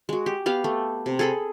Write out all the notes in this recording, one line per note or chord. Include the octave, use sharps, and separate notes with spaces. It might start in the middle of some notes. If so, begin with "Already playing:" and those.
G#3 F#4
G4
B3 G4 F5
A3
C3
G#4 A4 B5